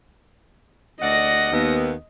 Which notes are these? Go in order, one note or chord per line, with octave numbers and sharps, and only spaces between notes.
D2 D5 D#5 F#5 A#6
D#2 B3